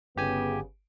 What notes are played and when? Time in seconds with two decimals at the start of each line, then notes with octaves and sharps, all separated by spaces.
0.16 G1 C#3 B3 G4 G#5